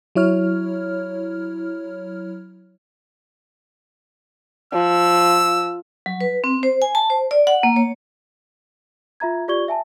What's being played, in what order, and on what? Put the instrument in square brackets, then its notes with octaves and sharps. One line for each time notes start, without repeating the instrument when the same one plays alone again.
[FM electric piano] F#3 E4 C#5 F6
[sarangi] F3 [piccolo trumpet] E6
[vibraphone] F#3
B4
C4
C5
G#5
A5
C5
D5
F#5
A#3
C#5
[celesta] F4 E5 A#5 G#6
F4 G4 D5 C#6 G#6 G7
E5 G#5 A5